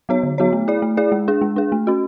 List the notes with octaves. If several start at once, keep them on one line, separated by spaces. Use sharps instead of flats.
F#3 B3 F#4 C#5
D3
F#3 B3 F#4 C#5
A3
E4 G#4 D5
A3
E4 G#4 D5
G#3
D4 G#4
G#3
D4 G#4
A3
C#4 F#4